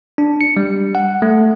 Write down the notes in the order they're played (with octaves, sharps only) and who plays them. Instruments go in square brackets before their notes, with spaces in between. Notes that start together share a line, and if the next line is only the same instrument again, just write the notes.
[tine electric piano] D4
C#7
G3
F#5
A3